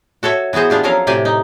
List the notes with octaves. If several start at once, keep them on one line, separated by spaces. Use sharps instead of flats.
F#4 A4 C#5 E5
E3 B3 F#4 G#4 C5
B3 D4 F4 G4
F3 F#3 C#4 A4 A#4 F5
A2 C3 G4 C5 D5 G#5
D#4